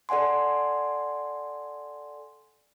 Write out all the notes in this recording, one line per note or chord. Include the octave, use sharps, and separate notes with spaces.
A4 D5 F#5 G#5 C6